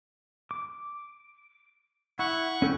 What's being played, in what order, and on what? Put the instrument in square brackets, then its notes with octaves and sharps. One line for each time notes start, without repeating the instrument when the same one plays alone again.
[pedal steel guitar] D6
[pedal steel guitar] E4 [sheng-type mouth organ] F#5 C#6
[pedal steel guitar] C#4 A4 G5